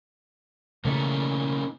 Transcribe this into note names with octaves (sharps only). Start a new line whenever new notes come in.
C#3 E3 A3 A#3 C#4 D#4